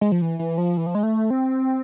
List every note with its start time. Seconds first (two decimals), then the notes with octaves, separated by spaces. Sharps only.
0.01 G#3
0.12 F3
0.22 E3
0.39 E3
0.58 F3
0.77 E3
0.86 F3
0.95 G#3
1.03 A3
1.30 C4